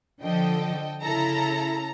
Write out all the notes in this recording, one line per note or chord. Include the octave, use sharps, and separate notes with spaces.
D3 F3 A4 D#5 G5
C#3 E4 A4 A#5